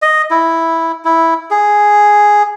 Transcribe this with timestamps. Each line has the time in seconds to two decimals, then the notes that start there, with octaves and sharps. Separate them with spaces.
0.02 D#5
0.31 E4
1.05 E4
1.51 G#4